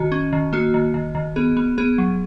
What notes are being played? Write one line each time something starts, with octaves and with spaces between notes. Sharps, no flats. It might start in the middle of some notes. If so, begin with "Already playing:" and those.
Already playing: D#3 F#4
C#4
D#3
A#3 F#4
D#3
D#3
D#3
B3 G#4
B3
B3 G#4
F#3